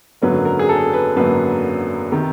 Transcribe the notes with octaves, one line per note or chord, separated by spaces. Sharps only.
G#1 F#2 D3 F#3 A#3 B4
A#4
G#4
A4
B4
G#1 F#2 D3 F#3 A#3 B4
C3 D#3